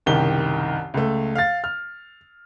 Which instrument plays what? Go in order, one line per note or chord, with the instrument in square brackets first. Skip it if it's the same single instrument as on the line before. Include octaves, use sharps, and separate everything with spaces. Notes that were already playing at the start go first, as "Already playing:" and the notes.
[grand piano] F#1 C2 D#3 G4 G7
C#2 A3
F5 A6
F6